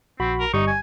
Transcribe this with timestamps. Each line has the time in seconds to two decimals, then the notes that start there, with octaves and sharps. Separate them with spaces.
0.20 A#1 C4 F#4 B5
0.40 A#4
0.54 G1 G3 D#4 D#5 C#6
0.67 G#5